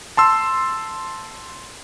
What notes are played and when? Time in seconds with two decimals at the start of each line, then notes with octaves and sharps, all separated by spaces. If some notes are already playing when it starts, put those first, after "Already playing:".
0.17 A5 C6 E6